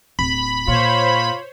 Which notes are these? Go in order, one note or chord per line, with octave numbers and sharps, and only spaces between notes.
D1 B5
A#2 F4 C5 C#5